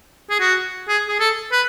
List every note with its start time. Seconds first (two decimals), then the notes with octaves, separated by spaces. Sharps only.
0.30 G#4
0.40 F#4
0.88 G#4
1.08 G#4
1.20 A4
1.52 B4